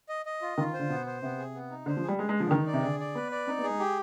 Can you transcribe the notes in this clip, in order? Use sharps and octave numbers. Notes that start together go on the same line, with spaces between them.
D#5
D#5
F4
D#3 F4
C5
D3
B2 B3
C5
C3 B3
G#4
B3
D#4
D3 C5
F3
G#4
G3
G#3 G#4
G#3
G#4
F3
D3
D#3 D#4
D5
C3
D3 G#4
D5
B3 B4
D5
C4 D#4
B3
G#4
G#3
G4